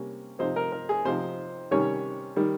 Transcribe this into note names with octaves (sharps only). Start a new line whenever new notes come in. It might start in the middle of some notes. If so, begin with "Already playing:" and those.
Already playing: C3 G3 A#3 C#4
C3 F3 C4 D#4 C5
A#4
A#4
G#4
C3 F3 C4 D#4 C5
C3 D#3 G3 C#4 C#5
D#3 G3